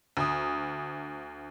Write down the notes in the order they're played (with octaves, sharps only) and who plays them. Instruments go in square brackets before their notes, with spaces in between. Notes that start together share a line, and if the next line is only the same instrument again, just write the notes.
[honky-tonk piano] D2 D#6